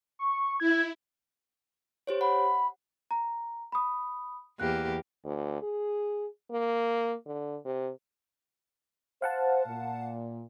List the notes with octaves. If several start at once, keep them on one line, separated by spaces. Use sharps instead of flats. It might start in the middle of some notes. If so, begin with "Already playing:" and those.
C#6
E4 G#6
G4 C5 C#5
F#5 B5
A#5
B5 D#6
E2 A#3 G4 F#6
D2
G#4
A#3
D3
C3
C5 F5 F#5 A5
A#2